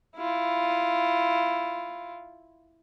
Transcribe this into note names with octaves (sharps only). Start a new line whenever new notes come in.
E4 F4